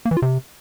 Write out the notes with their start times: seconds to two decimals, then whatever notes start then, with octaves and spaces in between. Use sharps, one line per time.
0.05 A#3
0.11 E3
0.17 F4
0.22 C3